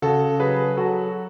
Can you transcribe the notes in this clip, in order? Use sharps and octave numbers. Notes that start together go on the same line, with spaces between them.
C#3 F#4 A4
F#3 G#4 B4
F#3 F#4 A4